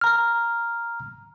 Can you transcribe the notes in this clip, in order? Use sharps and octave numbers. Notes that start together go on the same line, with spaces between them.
A#5 F6